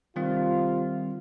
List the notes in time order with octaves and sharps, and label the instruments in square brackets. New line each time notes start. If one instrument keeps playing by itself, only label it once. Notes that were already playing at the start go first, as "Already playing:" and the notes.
[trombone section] C3 F4 [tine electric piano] D#3 G3 C4